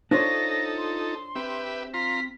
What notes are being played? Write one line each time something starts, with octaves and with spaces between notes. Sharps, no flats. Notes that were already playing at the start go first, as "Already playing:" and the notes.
D4 D#4 F4 A4 C5 C#5 A#6
C6
C4 G4 B4 E5
F4 A#5 C6 B6